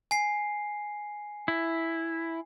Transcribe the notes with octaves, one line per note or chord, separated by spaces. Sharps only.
G#5 C7
E4